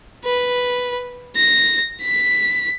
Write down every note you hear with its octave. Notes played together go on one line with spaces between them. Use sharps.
B4
A#6
B6